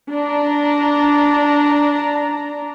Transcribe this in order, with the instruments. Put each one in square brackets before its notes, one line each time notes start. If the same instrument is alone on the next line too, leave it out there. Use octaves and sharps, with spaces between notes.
[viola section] D4 A#5